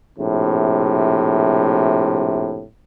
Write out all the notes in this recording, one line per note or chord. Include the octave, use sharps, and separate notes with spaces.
A#1 A2 C3